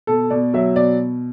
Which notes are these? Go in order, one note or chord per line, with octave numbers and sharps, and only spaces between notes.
B2 A4
B2 D5
F#3 E5
B2 D5